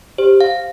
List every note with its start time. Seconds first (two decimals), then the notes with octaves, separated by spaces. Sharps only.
0.18 G4 C5
0.41 F5